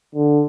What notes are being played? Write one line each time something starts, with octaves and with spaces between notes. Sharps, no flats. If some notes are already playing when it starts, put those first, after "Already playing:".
D3